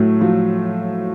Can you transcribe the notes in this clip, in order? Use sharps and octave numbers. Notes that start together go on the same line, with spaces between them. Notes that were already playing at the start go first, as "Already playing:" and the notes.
Already playing: A2 F#3 A3
F3 F#3